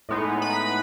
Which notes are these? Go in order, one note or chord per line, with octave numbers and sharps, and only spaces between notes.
A2 G#3 B3 D#4
B4 B5